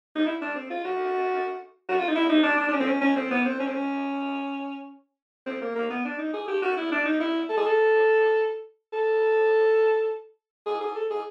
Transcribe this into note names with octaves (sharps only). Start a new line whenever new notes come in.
D#4
E4
D4
C4
F4
F#4
F#4
F4
D#4
E4
D#4
D4
D4
D4
C#4
C4
C#4
C#4
C4
B3
C4
C#4
C4
C#4
C4
A#3
A#3
B3
D4
D#4
G#4
G4
F#4
E4
D4
D#4
E4
A4
G#4
A4
A4
G#4
G#4
A4
G#4